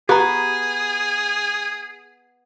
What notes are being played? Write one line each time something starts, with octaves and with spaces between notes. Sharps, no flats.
B3 G4 G#4 A#5